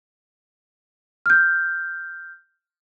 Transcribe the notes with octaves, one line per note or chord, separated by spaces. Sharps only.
F6 G6